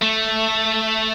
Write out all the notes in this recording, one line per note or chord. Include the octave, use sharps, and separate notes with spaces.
A3